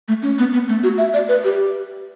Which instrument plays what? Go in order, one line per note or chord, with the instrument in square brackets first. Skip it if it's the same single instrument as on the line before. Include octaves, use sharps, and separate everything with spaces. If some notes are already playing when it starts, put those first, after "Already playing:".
[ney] A3
C#4
B3
B3
A3
F#4
E5
D5
B4
G4